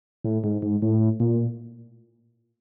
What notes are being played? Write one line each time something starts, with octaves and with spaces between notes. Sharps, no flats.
A2
G#2
G#2
A2
A#2